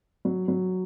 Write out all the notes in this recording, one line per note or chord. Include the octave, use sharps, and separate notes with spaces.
F#3
F#3